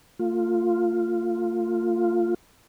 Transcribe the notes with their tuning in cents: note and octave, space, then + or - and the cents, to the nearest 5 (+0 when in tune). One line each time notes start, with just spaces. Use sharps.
A3 +40 F4 +0